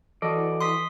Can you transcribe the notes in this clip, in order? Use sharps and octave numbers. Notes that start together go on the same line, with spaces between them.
E3 F#4 A4 D5 D#5
C6 D#6 B6